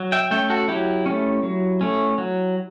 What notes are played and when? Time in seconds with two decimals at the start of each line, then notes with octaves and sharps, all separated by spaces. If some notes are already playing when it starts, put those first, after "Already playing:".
Already playing: F#3
0.12 E5 G5
0.31 A3 C#4 E5 G5
0.50 F#4 A4
0.68 F#3 E4 G4
1.06 A3 C#4
1.43 F#3
1.81 A3 C#4
2.18 F#3